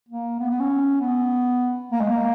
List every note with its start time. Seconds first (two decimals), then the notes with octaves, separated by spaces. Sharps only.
0.08 A#3
0.39 B3
0.50 B3
0.60 C#4
1.00 B3
1.91 A#3
2.00 G#3
2.11 A#3